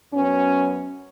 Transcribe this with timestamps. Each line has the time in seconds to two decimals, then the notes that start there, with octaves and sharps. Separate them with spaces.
0.13 F#2 F#3 B3 C#4